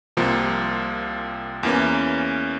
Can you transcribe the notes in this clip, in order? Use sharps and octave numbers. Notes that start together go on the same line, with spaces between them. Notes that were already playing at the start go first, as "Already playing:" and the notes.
C2 C3 F3 A#3 F4
E2 E3 A#3 C#4